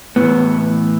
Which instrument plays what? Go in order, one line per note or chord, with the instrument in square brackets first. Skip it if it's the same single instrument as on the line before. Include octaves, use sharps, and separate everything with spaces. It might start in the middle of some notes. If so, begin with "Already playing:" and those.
[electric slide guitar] A2 E3 B3